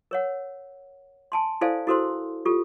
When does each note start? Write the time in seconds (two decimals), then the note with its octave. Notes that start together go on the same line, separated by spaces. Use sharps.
0.11 A#4 C#5 F#5
1.32 G#5 A5 C6
1.61 E4 A4 C5 D5 F5 G#5
1.87 E4 F#4 A4 A#4 C5 C6
2.45 F4 G4 A4